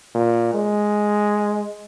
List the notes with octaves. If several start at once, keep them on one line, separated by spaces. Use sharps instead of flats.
A#2
G#3